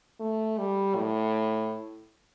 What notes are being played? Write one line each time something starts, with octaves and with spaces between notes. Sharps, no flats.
A3
G3
A2